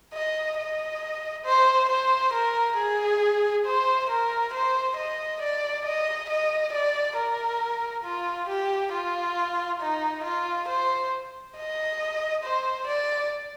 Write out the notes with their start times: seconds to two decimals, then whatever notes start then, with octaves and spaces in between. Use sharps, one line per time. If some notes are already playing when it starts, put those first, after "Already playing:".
0.14 D#5
0.58 D#5
1.45 C5
1.89 C5
2.33 A#4
2.77 G#4
3.66 C5
4.10 A#4
4.53 C5
4.97 D#5
5.42 D5
5.86 D#5
6.30 D#5
6.73 D5
7.17 A#4
8.04 F4
8.48 G4
8.92 F4
9.81 D#4
10.24 F4
10.68 C5
11.57 D#5
12.43 C5
12.87 D5